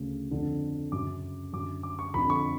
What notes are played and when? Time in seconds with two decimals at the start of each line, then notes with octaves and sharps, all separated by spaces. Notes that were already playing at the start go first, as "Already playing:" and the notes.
Already playing: D2 C#3
0.31 F2 D3
0.92 F#2 C#3 D6
1.53 F#2 D3 D6
1.83 D6
1.99 C#6
2.14 F2 D3 B5
2.30 C#6